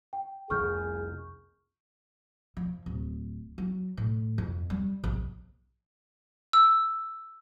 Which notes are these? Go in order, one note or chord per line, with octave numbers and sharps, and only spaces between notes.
G5
F1 C2 F2 G#4 C#6 F6 G6
F3
D1
F#3
A2
F2
G3
A#1
E6